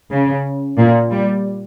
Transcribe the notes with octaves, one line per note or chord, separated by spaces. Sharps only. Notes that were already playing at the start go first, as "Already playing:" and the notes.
C#3
A#2
G3